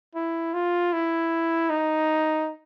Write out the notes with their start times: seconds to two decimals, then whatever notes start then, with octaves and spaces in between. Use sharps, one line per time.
0.15 E4
0.54 F4
0.93 E4
1.70 D#4